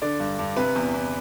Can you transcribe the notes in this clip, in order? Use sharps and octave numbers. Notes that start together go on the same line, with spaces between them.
D3 D5
G2
G2
C3 B4
E2
E2